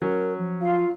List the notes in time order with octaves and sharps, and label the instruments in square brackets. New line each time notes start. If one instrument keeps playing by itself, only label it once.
[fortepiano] F#3 C#4 [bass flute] A#4
[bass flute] F3
[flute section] F4 F5